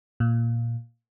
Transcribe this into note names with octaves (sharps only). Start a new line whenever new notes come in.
A#2